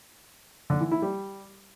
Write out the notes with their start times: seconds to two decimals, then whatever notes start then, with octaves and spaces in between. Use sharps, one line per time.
0.70 D3
0.81 E3
0.91 E4
1.02 G3